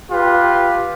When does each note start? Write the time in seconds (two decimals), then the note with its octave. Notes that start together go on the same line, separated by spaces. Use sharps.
0.10 F4 G4 B4